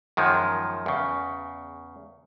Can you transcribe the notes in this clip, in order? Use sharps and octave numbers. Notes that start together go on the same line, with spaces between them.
F#2 D#3 F3 G#3
E2 C#3